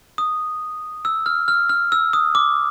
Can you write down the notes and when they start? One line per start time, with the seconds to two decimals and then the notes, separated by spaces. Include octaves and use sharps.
0.18 D#6
1.05 E6
1.26 F6
1.48 F6
1.69 F6
1.92 E6
2.13 D#6
2.35 D6